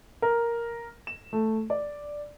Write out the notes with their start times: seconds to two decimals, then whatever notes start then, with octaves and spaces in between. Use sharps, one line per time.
0.22 A#4
1.07 E7
1.33 A3
1.70 D5